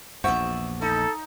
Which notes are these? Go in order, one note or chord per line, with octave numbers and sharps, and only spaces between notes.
A#1 E2 C5 E5 F#5 C#6
D#4 A4